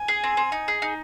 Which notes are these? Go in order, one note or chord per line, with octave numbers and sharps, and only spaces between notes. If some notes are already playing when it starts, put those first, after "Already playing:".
Already playing: G#5
G#4
C4
C4
D#4
G#4
D#4